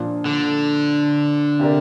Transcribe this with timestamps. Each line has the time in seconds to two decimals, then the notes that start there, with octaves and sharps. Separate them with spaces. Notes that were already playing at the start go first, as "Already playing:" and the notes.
Already playing: A#2 F3 D4
0.25 D3
1.59 C3 A#3 G4 A#4 D5